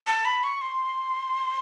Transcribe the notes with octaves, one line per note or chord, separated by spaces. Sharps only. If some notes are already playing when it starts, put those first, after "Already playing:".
A5
B5
C#6
C6